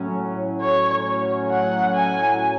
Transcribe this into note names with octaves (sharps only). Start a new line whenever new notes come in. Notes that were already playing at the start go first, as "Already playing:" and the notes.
Already playing: A2 F#3 C#4
C#5
F#5
G#5